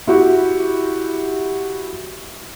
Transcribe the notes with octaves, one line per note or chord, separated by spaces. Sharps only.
E4 F#4 G4